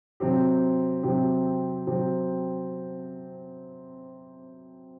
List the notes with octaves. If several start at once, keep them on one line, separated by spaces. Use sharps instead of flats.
C3 F#3 C4 G4
C3 F#3 C4 G4
C3 F#3 C4 G4